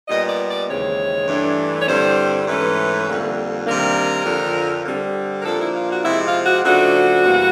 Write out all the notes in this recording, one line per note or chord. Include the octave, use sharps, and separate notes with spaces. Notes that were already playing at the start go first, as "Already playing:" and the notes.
A#2 G3 B3 D#5
D5
D5
D#2 C#3 E3 G#3 C4 C#5
G2 E3 A3 D4
C#5
G2 D3 G3 C4 E4 C5
G#2 E3 A3 C#4 B4
F2 D3 G3 A#3
C3 D#3 G3 A#3 D4 A#4
F2 D3 F3
D3 G3 C4
A#4
A#2 F3 A#3 D4 A4
E4
F4
F#4
C3 F3 G#3 E4
F4
F#4
C#3 F3 A3 D4 F#4
E2 B2 G3 A#3